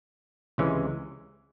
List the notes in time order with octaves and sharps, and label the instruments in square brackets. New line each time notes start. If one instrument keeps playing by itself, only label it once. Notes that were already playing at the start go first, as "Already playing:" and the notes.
[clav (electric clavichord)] C#2 C3 E3 G#3 C#4